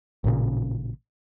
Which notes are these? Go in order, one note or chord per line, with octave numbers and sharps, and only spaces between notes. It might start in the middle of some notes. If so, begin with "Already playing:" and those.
A1 A#2 C#3